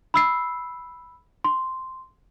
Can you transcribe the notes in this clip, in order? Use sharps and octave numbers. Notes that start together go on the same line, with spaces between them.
B5 E6 C7
C6